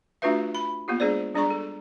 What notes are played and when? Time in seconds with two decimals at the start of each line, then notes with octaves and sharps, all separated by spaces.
0.22 A3 D4 F4 F#4 B4 E5
0.55 B5
0.88 A#3 B3 F4 G4
1.00 G#3 D4 G#4 C5 D5
1.35 G3 D4 G#4 D5 A#5 C#6
1.50 A4